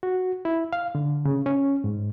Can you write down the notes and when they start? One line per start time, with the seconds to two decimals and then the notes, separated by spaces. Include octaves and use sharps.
0.03 F#4
0.45 E4
0.73 F5
0.95 D3
1.25 C#3
1.46 C#4
1.84 G#2